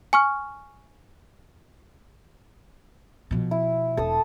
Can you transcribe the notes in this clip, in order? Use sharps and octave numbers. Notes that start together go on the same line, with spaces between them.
G#5 C#6 F6
B2 F3
E4
E1 A4 A5 D#6